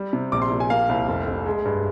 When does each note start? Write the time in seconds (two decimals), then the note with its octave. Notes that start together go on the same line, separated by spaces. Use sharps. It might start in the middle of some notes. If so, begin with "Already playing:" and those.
Already playing: G3
0.13 C3
0.32 A#1 D6
0.42 C6
0.51 A#2
0.60 G#5
0.70 A#3 F5
0.89 C2
1.08 F1
1.27 F1
1.46 G#3
1.65 G2